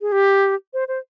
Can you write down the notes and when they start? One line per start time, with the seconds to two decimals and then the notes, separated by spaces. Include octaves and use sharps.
0.01 G#4
0.12 G4
0.74 C5
0.88 C5